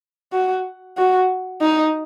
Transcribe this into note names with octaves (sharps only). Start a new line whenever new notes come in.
F#4
F#4
D#4